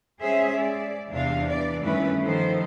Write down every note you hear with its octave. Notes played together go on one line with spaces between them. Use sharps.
G#3 C#4 G#4 C5 E5
D5
E2 C3 D4 F5
E3 D5
G2 D#3 A3 C#4 E4 B4
D#3 F3 A4 C5